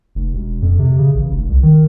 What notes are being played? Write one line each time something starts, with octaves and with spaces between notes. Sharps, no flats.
F1
E1
F2
C3
C#3
A1
F1
C2
D#3